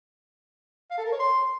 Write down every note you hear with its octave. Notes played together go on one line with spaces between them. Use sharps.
F5
A4
A#4
C#5
C6